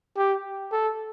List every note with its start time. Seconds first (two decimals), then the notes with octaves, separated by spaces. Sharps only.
0.18 G4
0.72 A4